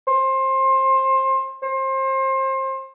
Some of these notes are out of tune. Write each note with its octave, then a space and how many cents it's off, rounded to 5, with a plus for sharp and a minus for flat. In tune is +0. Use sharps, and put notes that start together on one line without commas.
C5 +25
C5 +30